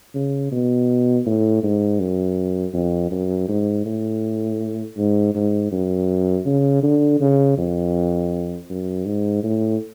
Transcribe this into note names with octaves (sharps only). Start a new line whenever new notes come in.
C#3
B2
A2
G#2
F#2
F2
F#2
G#2
A2
G#2
G#2
F#2
C#3
D3
C#3
F2
F#2
G#2
A2